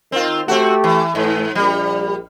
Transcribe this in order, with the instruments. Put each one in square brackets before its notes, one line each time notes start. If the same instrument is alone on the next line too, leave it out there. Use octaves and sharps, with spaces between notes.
[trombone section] D#3 [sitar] C4 F4
[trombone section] A3 G4 [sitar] C4 F#4
[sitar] E3
[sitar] G#2 [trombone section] E3 A3
[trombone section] A#1 [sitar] G3